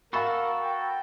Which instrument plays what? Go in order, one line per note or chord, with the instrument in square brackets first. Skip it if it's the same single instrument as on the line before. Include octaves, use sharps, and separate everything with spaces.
[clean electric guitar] F#4 A4 [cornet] A#4 [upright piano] F5 B5
[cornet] G5